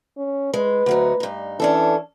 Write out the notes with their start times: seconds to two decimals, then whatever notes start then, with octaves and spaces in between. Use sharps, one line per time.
0.17 C#4
0.54 G#3 B4
0.86 D2 F#3 D#4
1.20 G2 D#4
1.60 E3 C#4 D4 A4